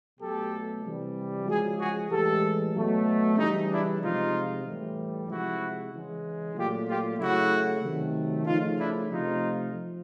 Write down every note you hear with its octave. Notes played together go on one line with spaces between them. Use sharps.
B2 F#3 A3 G4 A4
C3 E3 G3
C#3 F3 G#3 F#4 G#4
F#4 G#4
A2 E3 G#3 G4 A4
B2 F#3 A3
C#3 E3 G3 C#4 D#4
D4 E4
C3 F3 G#3 D#4 F4
A2 E3 G3
C3 F3 G#3 E4 F#4
C#3 E3 G#3
A#2 F#3 A3 F4 G4
F4 G4
C#3 F#3 A3 E4 F#4
C3 D#3 F#3 A3
C#3 F3 A3 D#4 F4
D4 E4
C3 F3 A3 D#4 F4
F3